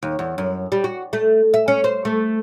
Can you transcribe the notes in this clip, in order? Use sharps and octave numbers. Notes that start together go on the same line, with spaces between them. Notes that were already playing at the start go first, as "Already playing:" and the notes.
D#2
E2
F#2
G3
F#4
A3
E5
C#4
C5
A3